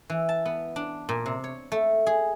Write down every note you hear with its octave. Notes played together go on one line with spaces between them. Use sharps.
E3
A5
B3
D4
A#2
C3
C#5
A3
G#4